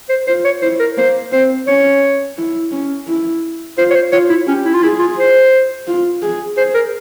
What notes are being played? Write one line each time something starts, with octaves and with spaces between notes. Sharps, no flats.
C5
F4 C5
C#5
E4 C5
A#4
A#3 C5
C4 C5
C#4 C#5
E4
C#4
E4
F4 C5
C#5
C5
F4 C#5
E4
C#4 G4
E4
F4
E4 G#4
F4
C5
F4
G#4
G#4 C5
A#4